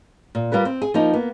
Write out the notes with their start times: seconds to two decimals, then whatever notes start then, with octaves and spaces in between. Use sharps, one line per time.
0.35 A#2
0.52 G3 F4 A#4 B4
0.65 C4
0.82 G#4
0.94 F3 A#3 D#4
1.13 A#3 B3